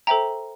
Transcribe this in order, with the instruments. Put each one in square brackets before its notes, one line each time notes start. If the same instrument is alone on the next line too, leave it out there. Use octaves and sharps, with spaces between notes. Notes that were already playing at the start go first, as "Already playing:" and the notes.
[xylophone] A4 C5 E5 G5 A#5